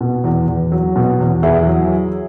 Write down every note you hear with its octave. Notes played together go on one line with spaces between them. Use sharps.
B2
E2
E2
F#3
B2
E2
E2 E4 G#4
F#3